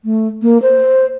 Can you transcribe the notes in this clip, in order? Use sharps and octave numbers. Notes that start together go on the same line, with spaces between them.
A3
A#3
C5